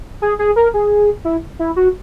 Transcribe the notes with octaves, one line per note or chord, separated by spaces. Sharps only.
G#4
G#4
A#4
G#4
E4
E4
F#4